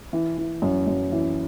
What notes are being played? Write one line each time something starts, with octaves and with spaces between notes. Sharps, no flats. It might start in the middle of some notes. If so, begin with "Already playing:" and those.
E3
E3
F#2
F#2
E3